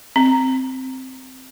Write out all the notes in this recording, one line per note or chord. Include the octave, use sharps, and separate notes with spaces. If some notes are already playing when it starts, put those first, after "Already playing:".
C4